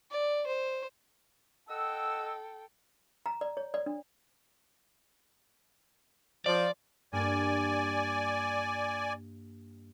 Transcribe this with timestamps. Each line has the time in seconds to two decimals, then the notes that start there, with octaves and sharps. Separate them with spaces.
0.11 D5
0.47 C5
1.69 A4 D#5 F#5 G5 E6
3.26 A#5
3.41 D5
3.57 C#5
3.74 D5
3.86 D4
6.46 F3 D5
7.13 G2 A#3 D5 G#5